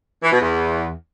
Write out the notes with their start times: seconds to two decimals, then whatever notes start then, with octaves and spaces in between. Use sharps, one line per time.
0.23 E3
0.32 B2
0.41 E2